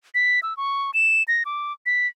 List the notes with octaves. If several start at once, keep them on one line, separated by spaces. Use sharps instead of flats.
B6
E6
C#6
E7
A#6
D6
B6